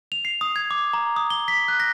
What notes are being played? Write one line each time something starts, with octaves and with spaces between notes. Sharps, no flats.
F7
C7
D#6
G#6
D6
A#5
D#6
G7
B6
F#6
A#6